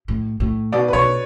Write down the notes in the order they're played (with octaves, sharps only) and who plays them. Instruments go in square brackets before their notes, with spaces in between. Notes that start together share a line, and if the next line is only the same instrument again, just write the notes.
[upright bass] A2
A2
[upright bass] B2 [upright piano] D5
[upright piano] B4
[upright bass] B2 [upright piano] C#5